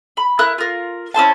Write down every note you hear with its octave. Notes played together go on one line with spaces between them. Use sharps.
B5
E4 A#4 F#6
F4 A#4
C#4 E4 C5 A5